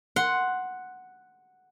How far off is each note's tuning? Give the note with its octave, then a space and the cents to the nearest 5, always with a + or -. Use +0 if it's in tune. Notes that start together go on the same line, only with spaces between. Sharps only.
F#5 +0 C6 +0